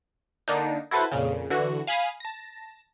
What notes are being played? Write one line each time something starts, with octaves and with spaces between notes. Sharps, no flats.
D3 A#3 D4 D#4
E4 F#4 A4 B4 C5
F2 A#2 C#3
D3 E3 F#4
F5 G#5 B5 D#6 F6
A5 A#6